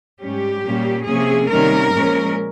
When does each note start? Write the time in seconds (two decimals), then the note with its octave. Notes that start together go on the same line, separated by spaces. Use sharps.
0.22 G#2 G3 C#4 G4
0.64 A#2 G3 A#3 C#4
1.07 C3 F3 A#3 C#4 G#4
1.50 C3 D#3 G3 A#3 C#4 A#4
1.93 A#2 F3 G#3 C#4